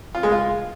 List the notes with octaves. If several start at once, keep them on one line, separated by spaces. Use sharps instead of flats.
F4
G#3
F4